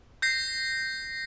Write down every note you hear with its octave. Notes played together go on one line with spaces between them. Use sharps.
G6 A#6 C7